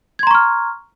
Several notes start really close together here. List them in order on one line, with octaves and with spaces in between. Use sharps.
G#6 C6 A#5 C#6 F6